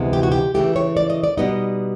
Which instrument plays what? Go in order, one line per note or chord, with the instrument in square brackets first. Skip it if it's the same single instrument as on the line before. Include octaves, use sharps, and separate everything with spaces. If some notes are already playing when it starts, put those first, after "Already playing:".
Already playing: [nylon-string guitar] D2 C3 E3 G#3 B3
G4
F#4
G4
C#3 E3 A3 G4
C#5
D5
D#5
D5
B2 G3 B3 D#4 D#5